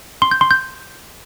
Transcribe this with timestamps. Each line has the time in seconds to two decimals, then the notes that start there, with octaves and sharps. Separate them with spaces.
0.22 C6
0.31 G6
0.41 C6
0.51 G6